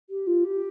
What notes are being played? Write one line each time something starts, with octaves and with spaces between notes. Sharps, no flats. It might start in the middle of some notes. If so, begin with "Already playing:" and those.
G4
F4
G4